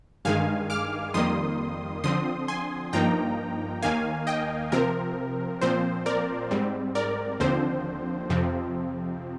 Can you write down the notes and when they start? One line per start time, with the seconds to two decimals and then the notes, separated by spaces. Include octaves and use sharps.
0.25 G2 D#3 G#3 F5 G#5
0.70 D6 F6
1.14 F2 D#3 G3 A#3 C6 D#6
2.04 D3 F3 C4 C6 D#6
2.48 G#5 C6
2.93 G2 F3 A#3 D#4 G5 A#5
3.82 D#2 D#3 A#3 F5 G#5
4.27 D#5 G5
4.72 C3 F3 C4 A#4
5.61 A#2 F3 C4 C5
6.06 A#4 D5
6.51 G#2 G3 C4
6.95 A#4 D5
7.40 D#2 D3 F3 C4 C5
8.30 F2 C3 F3 C4